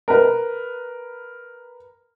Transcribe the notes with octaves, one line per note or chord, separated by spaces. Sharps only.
A#4 B4